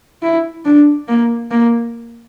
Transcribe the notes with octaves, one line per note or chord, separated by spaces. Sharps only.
E4
D4
A#3
A#3